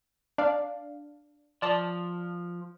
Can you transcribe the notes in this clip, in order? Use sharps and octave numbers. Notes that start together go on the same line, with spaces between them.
D4 D5 F5
F3 D5 A5